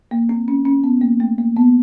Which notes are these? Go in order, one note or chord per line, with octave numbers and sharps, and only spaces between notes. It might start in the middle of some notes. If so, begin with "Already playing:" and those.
A#3
C4
C#4
C#4
B3
A#3
A3
A#3
B3